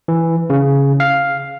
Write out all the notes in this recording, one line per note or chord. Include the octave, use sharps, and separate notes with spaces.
E3
C#3
F5